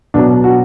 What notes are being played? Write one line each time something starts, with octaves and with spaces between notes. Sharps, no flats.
B2 F#3 D4
F#4